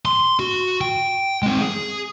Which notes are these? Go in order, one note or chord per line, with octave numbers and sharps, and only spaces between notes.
C6
F#4
G5
G#3 C4
G#4